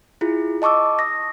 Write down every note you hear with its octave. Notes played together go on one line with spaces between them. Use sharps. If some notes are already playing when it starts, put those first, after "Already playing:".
E4 F4 G#4
D#5 A5 C#6 D6 E6
D#6 A#6